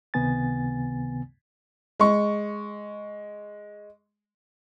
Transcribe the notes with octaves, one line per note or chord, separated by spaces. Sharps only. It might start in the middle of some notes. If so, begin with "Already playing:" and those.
C#2 C3 D#3 B3 G#5 A6
G#3 C#6